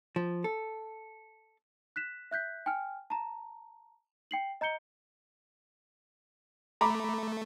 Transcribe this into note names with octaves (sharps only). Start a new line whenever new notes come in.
F3
A4
F#6 B6 E7
E5 F#6 G6 B6
G5 G#5 F6
A5 A#5
G5 C7 F#7
D#5 A#5 G6 C#7 G7
A3 A#5 B5 D6